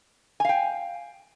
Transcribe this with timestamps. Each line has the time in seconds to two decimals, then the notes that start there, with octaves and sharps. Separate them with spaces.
0.40 G#5
0.45 F5
0.49 G5